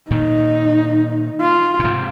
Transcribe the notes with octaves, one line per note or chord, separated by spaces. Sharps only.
A#2 D#3 D#4
F4
A#2
G#2 C3